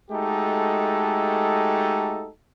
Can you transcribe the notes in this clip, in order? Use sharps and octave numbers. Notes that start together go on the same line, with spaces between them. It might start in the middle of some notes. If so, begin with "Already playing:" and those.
G#3 A3 D#4 F#4 G4 A4